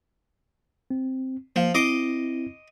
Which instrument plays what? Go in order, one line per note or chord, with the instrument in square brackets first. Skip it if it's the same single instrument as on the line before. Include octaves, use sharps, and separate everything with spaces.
[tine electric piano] C4
[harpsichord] F3 [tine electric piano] A#3
[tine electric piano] C4 E4 [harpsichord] D#5 C6 D6